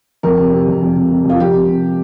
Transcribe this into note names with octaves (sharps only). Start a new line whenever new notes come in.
F2 A#4
C3
C3
F2
F2
C3
C3
F2 F4
F2 G4
C3
C3